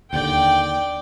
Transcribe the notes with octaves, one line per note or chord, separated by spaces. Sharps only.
D#2 D3 D5 G5